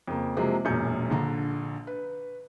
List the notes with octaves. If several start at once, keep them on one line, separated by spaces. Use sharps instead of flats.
F2 C#3 A#3
C3 F3 F#3 G#3 A#3
E1 F#2 A#2 G6 C#7
A#1 D3 A#5
B4